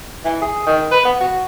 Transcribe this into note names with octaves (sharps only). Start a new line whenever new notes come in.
E3
G#4
D#3
B4
B3
F#4